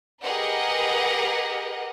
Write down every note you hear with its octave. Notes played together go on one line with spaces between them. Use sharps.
G4 G#4 A#4 B4 D#5 F#5